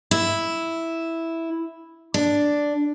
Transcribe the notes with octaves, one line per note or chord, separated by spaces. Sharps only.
E4
D4